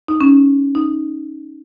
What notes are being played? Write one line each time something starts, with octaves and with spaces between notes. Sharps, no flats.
D#4
C#4
D#4